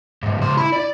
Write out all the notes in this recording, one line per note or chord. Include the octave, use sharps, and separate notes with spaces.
G#2 F3
C#2 C5
E4 B5
D5